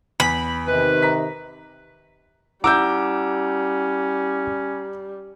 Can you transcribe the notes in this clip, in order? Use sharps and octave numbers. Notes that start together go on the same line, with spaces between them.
E2 B5
C3 D#3 B4
A#5 B6
G3 C#4 E4 F#5 A#5 D6 E6 G6